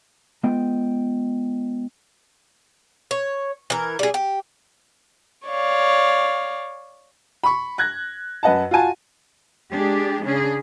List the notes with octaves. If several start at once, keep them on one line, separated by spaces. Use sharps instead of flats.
G#3 B3 F4 D#5 G5
C#5
E3 A#4
G3 G#4
G4
C#5 D5 F5
B5 C#6
F#6 G#6 A#6
F#2 B4 D#5 F#5 A5
F4 F#4 G#5 A5
G#3 D4 G4 G#4
C#3 C#4 D4 G#4